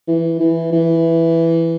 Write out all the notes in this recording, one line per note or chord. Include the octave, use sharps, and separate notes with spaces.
E3
E3
E3